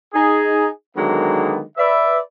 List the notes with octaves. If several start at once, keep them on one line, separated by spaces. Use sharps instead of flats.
D#4 G#4
D3 D#3 F#3 G#3 A#3 B3
B4 D5 E5